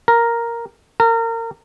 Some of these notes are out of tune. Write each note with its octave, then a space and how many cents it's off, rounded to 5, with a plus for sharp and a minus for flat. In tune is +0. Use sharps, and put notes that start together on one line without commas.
A#4 +0
A#4 -30